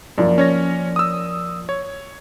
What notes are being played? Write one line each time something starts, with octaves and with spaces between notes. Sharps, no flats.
F#2 F3 A#3 D5
C#4 C#5 A#6
D#6 E6
C#5